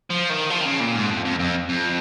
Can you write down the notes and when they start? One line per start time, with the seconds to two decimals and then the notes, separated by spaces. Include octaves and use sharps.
0.10 F3
0.30 D#3
0.50 F3
0.61 D#3
0.65 C#3
0.80 A#2
0.95 G#2
1.10 F2
1.25 F2
1.39 F2
1.69 F2